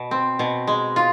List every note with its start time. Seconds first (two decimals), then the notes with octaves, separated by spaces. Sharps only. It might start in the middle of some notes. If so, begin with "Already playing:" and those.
Already playing: B2
0.11 C4
0.39 B2
0.67 G#3
0.96 F4